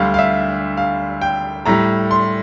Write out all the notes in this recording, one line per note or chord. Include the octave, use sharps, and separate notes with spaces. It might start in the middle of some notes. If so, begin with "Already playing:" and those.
Already playing: D2 D3 G3 F5
F5
E5
F5
G5
A2 G3 A#5
C6